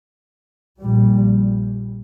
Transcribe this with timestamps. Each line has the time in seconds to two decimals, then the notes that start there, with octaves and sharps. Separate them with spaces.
0.79 A#1 A#2 G3